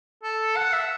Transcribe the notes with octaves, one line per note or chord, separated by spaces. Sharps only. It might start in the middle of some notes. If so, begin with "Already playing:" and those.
A4
F#5
E5